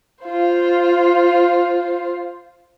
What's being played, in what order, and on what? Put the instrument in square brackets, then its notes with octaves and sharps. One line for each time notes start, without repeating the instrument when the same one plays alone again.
[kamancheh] F4 C5